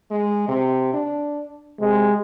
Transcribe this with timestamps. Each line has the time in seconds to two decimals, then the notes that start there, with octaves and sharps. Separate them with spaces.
0.11 G#3
0.48 C3
0.93 D4
1.80 C3 G#3